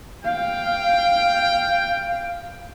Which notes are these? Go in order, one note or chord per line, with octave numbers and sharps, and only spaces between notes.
F5 G5